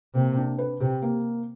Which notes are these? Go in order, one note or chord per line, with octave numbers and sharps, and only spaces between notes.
C3 A#3
D4
B4
C3 G4
A#3